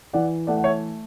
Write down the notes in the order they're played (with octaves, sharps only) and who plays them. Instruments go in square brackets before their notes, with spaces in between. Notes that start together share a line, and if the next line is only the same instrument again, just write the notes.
[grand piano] E3 D5 F#5
A3 D5 F#5
F#5
C#5 E5